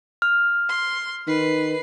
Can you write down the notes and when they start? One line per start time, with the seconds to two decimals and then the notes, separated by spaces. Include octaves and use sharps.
0.22 F6
0.69 C6
1.28 D#3 B4 C7